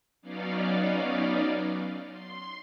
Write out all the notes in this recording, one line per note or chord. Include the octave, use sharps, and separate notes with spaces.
F#3 B3 C#4 D#4 D5 F5
C6